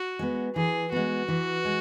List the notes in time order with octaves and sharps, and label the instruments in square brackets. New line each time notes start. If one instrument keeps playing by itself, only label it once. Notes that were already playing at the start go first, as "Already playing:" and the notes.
Already playing: [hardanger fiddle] F#4
[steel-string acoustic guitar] G#3 B3
[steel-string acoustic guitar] E3 [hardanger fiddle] G#4
[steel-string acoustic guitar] G#3 B3 [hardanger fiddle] F#4
[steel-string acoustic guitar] E3
G#3